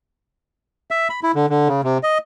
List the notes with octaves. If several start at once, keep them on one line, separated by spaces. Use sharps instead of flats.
E5
B5
E4
D3
D3
C#3
C3
D#5